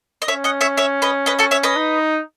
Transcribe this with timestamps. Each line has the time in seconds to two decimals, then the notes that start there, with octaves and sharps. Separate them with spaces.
0.22 D#5
0.28 C#4 C#5 E5
0.44 D#5 F#5
0.61 C#5 E5
0.77 C#5 E5
1.02 B4 D#5
1.26 B4 D#5
1.39 F#4 A4
1.51 C#5 E5
1.63 B4 D#5
1.76 D#4